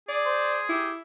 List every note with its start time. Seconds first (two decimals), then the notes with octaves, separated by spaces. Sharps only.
0.08 G#4 D5
0.26 C5
0.69 E4 G4